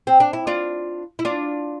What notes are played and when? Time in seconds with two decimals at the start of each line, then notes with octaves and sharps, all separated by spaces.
0.07 C4
0.20 D4
0.33 E4
0.47 D4 F4
1.19 E4
1.25 D4 F4